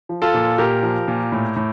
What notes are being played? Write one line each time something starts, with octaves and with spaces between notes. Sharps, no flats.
F3
F4 A4
A#2
A#2 G4 A#4
F3
A#2
A2
A2